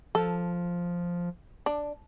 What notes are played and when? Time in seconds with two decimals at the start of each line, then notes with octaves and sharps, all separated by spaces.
0.15 F3 A4
1.66 D4